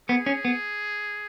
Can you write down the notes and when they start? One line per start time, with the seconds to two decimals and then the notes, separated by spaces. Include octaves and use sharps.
0.09 B3 G#4
0.26 C#4
0.45 B3